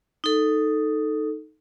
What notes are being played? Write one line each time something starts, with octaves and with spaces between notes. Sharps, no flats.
D#4 A4